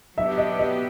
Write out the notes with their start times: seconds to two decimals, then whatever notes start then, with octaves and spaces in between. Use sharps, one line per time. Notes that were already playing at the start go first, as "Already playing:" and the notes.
0.17 F#3 B3 D4 G4 E5
0.38 D#5
0.59 D#5